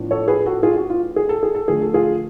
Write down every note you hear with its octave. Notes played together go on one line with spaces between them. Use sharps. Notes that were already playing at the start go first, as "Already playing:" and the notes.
Already playing: A2 F3 B3 D4
A4 C#5
G#4 B4
F#4 A4
F4 G#4
F#4
F4
G#4
A4
G#4
A4
D3 F3 A3 G#4
A4
F4 G#4